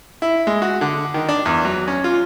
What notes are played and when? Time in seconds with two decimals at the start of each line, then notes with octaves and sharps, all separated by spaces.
0.22 E4
0.47 G#3
0.62 F#4
0.81 D3
1.14 D#3
1.29 D4
1.45 E2
1.65 F#3
1.88 C#4
2.04 F4